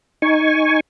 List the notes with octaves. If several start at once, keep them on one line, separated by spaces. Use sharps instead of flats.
D#4 G#5 C#6